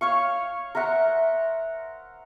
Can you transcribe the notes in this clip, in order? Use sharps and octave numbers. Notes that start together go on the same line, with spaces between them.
C#5 F5 C#6
A#4 C5 E5 F#5